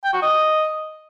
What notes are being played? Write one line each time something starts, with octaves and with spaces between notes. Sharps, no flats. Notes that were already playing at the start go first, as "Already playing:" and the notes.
G5
F#4
D#5